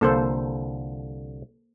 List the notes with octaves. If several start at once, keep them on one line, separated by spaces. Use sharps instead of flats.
C2 D3 F3 A#3 A4 C5